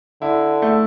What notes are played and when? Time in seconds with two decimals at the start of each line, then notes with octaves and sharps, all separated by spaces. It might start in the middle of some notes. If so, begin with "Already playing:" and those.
0.22 D3 E4
0.62 A3